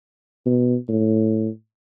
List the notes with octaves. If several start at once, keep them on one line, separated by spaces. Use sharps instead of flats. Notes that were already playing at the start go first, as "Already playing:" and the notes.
B2
A2